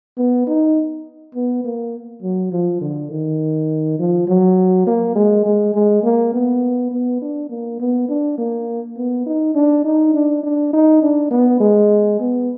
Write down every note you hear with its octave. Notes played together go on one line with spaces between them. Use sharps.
B3
D#4
B3
A#3
F#3
F3
D3
D#3
F3
F#3
A#3
G#3
G#3
G#3
A#3
B3
B3
D4
A#3
B3
D4
A#3
B3
D#4
D4
D#4
D4
D4
D#4
D4
B3
G#3
B3